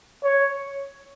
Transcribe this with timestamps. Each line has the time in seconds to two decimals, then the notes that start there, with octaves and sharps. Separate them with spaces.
0.24 C#5